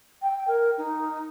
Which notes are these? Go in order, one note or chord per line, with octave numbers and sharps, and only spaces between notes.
G5
A#4
D#4